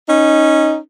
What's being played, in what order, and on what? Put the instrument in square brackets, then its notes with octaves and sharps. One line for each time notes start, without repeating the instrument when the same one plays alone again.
[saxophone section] C#4 D#4